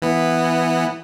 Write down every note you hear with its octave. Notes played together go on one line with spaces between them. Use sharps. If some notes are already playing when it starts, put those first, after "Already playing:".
E3 B3